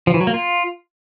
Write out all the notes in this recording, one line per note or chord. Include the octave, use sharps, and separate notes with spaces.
F3
E3
F#3
A#3
F4